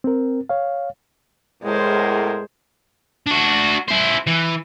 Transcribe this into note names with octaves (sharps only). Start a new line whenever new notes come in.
C4 A#4
C#5 F5
E2 A2 G#3 A#4 C5
D4 F#4
E4 C5
E3